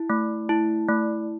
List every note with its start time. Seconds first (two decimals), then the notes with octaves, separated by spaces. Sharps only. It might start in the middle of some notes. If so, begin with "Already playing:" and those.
Already playing: E4
0.10 A3
0.49 E4
0.89 A3